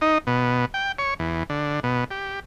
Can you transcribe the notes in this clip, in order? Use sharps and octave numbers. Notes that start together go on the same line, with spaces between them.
D#4
B2
G5
C#5
E2
D3
B2
G4